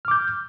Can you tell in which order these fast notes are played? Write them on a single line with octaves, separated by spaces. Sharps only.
F6 D6 G6